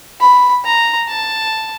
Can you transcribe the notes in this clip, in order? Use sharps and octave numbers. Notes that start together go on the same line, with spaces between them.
B5
A#5
A5